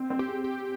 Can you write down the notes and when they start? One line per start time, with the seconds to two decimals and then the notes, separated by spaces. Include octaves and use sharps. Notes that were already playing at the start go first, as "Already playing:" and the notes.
Already playing: C4
0.10 C4
0.19 G4
0.28 G#4
0.44 G4